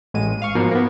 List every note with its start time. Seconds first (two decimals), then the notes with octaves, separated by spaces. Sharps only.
0.14 A1 G#3 D#7
0.42 F5 C#6
0.55 G#2 B2 F3 A#3
0.71 A#3 B3